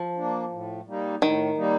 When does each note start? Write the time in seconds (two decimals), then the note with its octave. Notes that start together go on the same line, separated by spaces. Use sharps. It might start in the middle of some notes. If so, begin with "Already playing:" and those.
Already playing: F3
0.17 A#3 D4
0.52 A2
0.87 G3 A#3 D#4
1.22 A2 D#3
1.57 G3 A#3 D#4